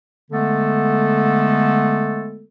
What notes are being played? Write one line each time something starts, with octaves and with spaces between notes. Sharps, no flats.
D3 G#3 A3 B3 A4